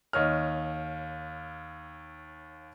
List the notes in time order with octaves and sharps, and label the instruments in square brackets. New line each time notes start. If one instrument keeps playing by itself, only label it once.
[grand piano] D#2 C#5 D#5 F6